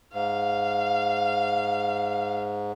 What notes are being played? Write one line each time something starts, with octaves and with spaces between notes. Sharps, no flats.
G#2 F5